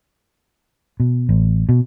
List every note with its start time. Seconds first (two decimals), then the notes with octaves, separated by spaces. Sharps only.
1.00 B2
1.29 A1
1.69 B2